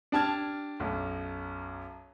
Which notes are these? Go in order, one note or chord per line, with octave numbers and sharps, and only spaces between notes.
D4 G4 A5 F6 G#6
B1 F#2